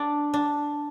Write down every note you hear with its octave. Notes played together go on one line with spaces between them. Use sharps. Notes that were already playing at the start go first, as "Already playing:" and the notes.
Already playing: D4 D5
D4